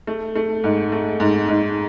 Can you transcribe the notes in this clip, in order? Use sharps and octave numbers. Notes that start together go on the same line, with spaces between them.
A3
A3
G#2
A3
G#2
G#2